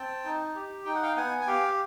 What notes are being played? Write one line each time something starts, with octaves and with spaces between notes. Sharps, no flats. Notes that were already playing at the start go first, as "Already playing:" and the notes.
Already playing: C4 G5 A5
D#4
G4
D#4 G5
F#5
F5 G5
B3 F#5 G#5
G#5
G4 F5 G5